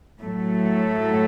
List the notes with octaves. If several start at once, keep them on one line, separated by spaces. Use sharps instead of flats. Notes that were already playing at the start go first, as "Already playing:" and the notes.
A2 F#3 A3